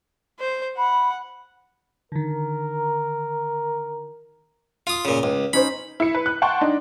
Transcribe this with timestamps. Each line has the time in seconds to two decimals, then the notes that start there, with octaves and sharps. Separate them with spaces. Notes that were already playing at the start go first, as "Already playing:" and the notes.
0.40 C5
0.78 F#5 B5
2.12 D3 D#3 A#4
4.87 F4 D#6
5.05 A#2 C#3
5.23 C#2
5.53 C#4 D#4 C5 B5
6.00 E4 C#7
6.15 B4
6.26 F#6
6.42 F#5 G5 A5 C6 C#6
6.61 D4 D#4